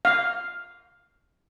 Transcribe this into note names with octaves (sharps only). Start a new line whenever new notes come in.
F5